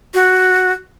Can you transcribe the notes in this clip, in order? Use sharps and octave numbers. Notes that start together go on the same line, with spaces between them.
F#4